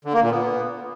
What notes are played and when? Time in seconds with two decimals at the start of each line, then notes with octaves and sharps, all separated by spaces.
0.05 D3
0.13 A#3
0.22 A#2
0.31 B3